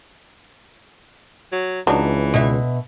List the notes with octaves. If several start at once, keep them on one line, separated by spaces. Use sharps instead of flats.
F#3
C#2 E3 F#3 D4 D#4
B2 E5